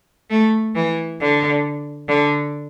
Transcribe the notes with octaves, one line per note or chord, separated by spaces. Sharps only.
A3
E3
D3
D3